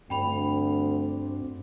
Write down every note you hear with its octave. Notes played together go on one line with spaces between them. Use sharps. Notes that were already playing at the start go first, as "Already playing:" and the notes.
D2 G2 C4 D4 G5 B5 F7